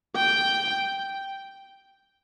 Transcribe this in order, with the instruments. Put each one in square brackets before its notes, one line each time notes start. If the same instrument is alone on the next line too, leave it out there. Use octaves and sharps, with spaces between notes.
[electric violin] G5